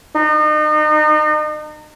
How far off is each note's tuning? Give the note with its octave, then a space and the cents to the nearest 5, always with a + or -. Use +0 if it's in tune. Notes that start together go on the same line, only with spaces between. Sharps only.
D#4 -35